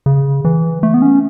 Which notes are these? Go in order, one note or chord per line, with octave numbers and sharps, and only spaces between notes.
C#3
E3
A3
B3
C#4